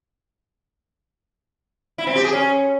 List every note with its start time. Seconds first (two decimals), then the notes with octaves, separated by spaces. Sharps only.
1.98 E4
2.07 C4
2.15 G4
2.24 G#4
2.33 C#4